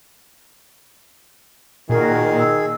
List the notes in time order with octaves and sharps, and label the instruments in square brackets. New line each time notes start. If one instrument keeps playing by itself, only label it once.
[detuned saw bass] A#2 [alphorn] D#3 [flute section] F#4 A#4 [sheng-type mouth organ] G#4
[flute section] E6